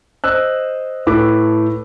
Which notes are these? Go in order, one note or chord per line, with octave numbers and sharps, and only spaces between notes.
C5 D#5 E6 F#6
A2 A4 B4 D6